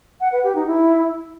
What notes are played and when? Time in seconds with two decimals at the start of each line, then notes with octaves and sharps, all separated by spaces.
0.21 F#5
0.32 B4
0.44 G4
0.55 D#4
0.67 E4